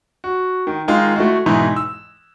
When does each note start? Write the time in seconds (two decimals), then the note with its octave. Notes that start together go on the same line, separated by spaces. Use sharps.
0.24 F#4
0.67 D#3
0.88 D#3 G#3 D#4 F4
1.16 A3 E4 F#4
1.46 G#2 B2 E3 D#4 E4
1.76 E6